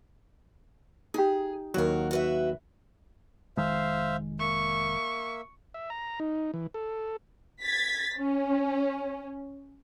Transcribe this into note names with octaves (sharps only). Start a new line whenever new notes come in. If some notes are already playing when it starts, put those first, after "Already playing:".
D#4 G4 G#4
D#2 F#3 F#4 A#4
F#4 B4 E5
F1 D#3 G#3 C5 E5 F5
A#3 E5 C#6
E5
A#5
D#4
E3
A4
G#6 A6 B6
C#4